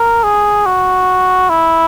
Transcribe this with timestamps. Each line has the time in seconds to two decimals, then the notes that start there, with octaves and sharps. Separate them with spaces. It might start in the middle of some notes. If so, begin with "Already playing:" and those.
Already playing: A#4
0.24 G#4
0.66 F#4
1.49 E4